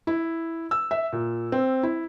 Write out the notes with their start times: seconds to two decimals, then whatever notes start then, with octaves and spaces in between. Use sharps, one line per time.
0.07 E4
0.71 E6
0.91 E5
1.12 A#2
1.52 C4
1.83 E4